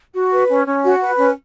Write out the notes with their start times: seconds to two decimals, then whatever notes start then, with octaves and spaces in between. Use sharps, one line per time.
0.14 F#4
0.32 B4
0.50 C#4
0.66 C#4
0.84 F#4
1.01 B4
1.18 C#4